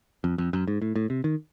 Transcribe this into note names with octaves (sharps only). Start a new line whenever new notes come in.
F2
F2
F#2
G#2
A2
A2
C3
D#3